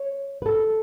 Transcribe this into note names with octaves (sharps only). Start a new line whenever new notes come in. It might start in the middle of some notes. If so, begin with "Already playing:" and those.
Already playing: C#5
B4
A4